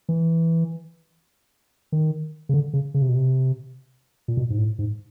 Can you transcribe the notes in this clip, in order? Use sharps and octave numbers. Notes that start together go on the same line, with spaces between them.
E3
D#3
C#3
D3
C#3
C#3
C3
B2
C3
A#2
B2
G#2
A2
G#2